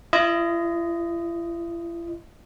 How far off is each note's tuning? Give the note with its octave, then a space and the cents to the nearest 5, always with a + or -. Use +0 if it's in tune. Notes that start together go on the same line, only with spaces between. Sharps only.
E4 +45 D#5 +0